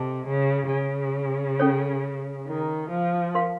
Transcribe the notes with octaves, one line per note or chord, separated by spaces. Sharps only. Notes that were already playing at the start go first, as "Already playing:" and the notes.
Already playing: C3 A4 D#5 A5
C#3
C#3
C#4 A4 C#5
D#3
F3
A#4 F5 C6